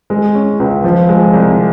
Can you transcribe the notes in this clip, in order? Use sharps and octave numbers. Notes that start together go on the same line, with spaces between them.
G#3
C#4
C#2
F3
G#3
C2